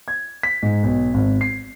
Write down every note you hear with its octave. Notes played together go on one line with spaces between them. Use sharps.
G#6
B6
G#2
B1
G#1
C7